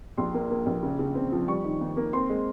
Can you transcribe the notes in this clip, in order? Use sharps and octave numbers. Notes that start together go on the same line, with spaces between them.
A#1 C6
A#3
A#3
A#1
C#3
C#3
C4
F3
G3 C#6
D#3
D#2
A#3
C4 C6
G#3